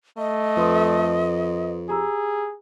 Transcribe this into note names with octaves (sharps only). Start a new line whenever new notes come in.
A3 D#5
F2 B4 C6 D#6
G4 G#4 A#5 E6